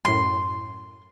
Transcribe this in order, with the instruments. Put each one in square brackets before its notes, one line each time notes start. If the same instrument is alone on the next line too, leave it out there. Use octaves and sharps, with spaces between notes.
[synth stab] F#2 A2 [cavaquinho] C6